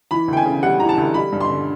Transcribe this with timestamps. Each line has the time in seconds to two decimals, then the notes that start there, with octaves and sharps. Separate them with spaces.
0.11 E3 B5
0.28 D2 G5
0.37 G#5
0.45 C#3
0.63 G3 F#5
0.80 E3 A#5
0.89 A5
0.97 D2
1.14 G3 B5
1.32 G2
1.40 C6
1.49 D3